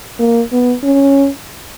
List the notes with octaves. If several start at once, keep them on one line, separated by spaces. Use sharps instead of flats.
A#3
B3
C#4